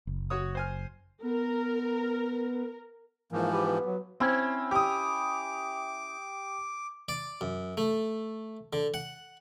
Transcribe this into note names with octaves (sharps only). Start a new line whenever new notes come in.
F#1
F#4 C#5 D#6
C5 G#5 F6
B3 A#4
G#2 E3 F3 A#3
G4 B4
B3
F#3
C4 C#4 E4
G4 D6 D#6
D5
F#2
A3
D3
F#5